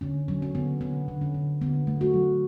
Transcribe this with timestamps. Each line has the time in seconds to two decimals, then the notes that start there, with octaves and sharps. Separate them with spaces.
0.01 D3 C#4
0.28 F#3 C#4
0.42 C#4
0.55 D3 B3
0.81 D3 B3
1.08 D3
1.21 C#4
1.35 D3
1.61 D3 B3
1.87 A3
2.01 F#4
2.14 F#3